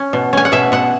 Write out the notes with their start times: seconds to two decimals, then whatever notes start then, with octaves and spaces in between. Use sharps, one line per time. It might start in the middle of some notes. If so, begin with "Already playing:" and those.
Already playing: C#4
0.13 B2
0.33 C#4 G#5
0.45 F#5
0.52 B2 E5
0.72 B2 F#5